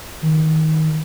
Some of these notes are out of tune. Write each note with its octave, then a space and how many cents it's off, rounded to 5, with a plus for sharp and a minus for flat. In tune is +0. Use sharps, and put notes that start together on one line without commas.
D#3 +20